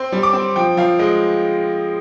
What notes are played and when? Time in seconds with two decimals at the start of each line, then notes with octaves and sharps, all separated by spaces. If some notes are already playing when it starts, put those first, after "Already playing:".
Already playing: C4 C6
0.12 G3
0.23 D6
0.33 C4
0.56 F3 G5
0.77 F3 F5
0.99 G#3 D#5